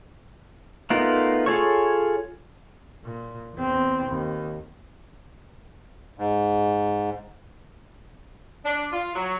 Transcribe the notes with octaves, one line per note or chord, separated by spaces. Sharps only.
A3 B3 D#4 F4 A#4
F4 G#4 A4 C#5 C#6
A#2
E2 C4
D#2
G#2
D4
F4
F#3